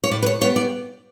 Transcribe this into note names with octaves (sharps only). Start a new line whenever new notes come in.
C#5
A2 D5
B4
C#5
G3 B3 C#5
D5